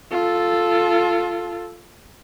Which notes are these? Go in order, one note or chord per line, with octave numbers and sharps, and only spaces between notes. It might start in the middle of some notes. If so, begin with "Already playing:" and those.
F4 A4